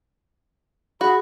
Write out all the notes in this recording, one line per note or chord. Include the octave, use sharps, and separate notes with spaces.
F#4 G#4 B5